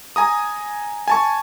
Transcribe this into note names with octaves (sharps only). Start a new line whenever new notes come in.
G#5 A#5 D#6
G#5 A5 C#6